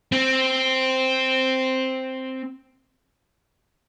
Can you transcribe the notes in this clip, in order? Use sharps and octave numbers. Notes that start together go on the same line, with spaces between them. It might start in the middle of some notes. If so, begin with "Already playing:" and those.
C4